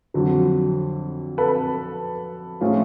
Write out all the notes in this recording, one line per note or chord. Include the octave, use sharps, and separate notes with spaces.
F2 D3 F#3
A4 B4
A2 F3 G#3 C#4 F4